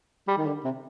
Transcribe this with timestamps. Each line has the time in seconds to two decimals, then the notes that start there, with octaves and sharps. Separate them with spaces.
0.28 G3
0.38 D#3
0.46 D3
0.64 C3